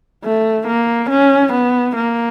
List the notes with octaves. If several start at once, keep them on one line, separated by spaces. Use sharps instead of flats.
A3
A#3
C#4
B3
A#3